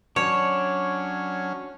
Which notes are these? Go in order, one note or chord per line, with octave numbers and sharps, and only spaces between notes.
F#3 C#4 D4 C#5 F6